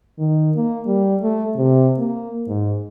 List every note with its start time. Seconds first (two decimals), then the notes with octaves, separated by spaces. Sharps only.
0.18 D#3
0.56 A#3
0.86 G3
1.22 A3
1.56 C3
1.98 A#3
2.47 G#2